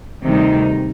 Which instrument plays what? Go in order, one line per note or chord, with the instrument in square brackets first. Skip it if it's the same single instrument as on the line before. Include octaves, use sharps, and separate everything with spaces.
[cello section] D2 C3 D#3 G3 D#4